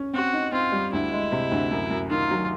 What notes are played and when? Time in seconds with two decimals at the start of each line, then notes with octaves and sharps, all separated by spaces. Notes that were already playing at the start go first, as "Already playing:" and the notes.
Already playing: C#4
0.14 C4 F#4
0.33 D#4
0.52 C4 F4
0.72 G3
0.92 D2 E4
1.12 G#3
1.32 C3
1.52 D2
1.71 F#2
1.90 F#2
2.10 D#3 F4
2.31 F#3